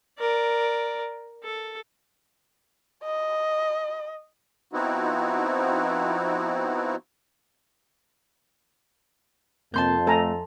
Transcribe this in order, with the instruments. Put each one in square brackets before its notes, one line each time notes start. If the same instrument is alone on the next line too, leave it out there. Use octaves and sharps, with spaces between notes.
[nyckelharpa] A#4 D5
A4
[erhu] D#5
[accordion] F3 B3 C4 D#4 E4 F#4
[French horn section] F2 [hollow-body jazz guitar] C3 A#3 [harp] A5 C6 G6
[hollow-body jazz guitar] A3 [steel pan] A4 G#5 A#5